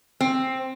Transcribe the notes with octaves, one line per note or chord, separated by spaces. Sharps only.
C4